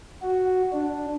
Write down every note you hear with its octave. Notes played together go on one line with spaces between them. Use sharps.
F#4
D4